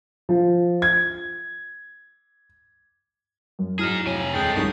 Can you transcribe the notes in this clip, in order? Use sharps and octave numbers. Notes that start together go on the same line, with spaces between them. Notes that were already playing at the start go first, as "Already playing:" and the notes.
F3
G#6
F#2
F#3 D#4 E4 G#4 A#5 F6 E7
C3 C#5 G#5
D#1 G#3 D4 G#4 A4 G5
C2 D#3 F3 C#4 D#6